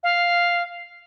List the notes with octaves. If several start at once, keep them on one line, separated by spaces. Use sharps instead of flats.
F5